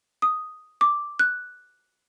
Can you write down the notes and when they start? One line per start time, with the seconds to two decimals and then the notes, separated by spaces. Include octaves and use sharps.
0.22 D#6
0.81 D6
1.19 F#6